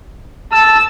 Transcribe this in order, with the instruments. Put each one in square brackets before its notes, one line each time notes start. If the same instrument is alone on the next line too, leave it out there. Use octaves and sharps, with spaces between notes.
[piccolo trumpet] A5 [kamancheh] E6